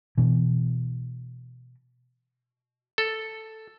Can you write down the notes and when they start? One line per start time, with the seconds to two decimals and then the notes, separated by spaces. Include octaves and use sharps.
0.18 B2 E3
2.98 A4